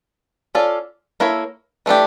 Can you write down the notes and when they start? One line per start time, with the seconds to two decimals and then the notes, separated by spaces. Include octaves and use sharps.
0.55 C#4 F4 A4 D5
1.20 A#3 E4 A4 C#5
1.86 E3 A3 D4 G4